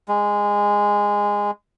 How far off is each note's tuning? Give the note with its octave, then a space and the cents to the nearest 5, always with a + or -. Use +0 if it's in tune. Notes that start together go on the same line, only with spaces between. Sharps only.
G#3 -15